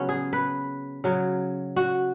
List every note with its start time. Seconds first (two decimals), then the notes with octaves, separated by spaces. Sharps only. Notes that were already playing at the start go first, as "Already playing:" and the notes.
Already playing: C#3 F#3 B3 C#4
0.09 G#4
0.33 B4
1.04 C#3 F#3
1.76 F#4